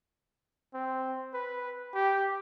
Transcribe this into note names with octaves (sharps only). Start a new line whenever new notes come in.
C4
B4
G4